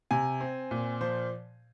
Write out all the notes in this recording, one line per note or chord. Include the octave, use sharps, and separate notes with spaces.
C3 G#5
C4
A#2
F3 C5